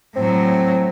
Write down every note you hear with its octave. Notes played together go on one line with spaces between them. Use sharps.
A2 F#3 C4